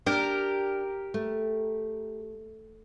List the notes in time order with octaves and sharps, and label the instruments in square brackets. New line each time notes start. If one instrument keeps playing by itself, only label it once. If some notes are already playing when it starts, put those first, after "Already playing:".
[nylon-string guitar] D4 [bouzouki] G4 A#4
[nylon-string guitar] A3